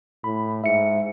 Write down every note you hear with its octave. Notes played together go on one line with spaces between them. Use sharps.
A2 B5
G#2 E5 C#7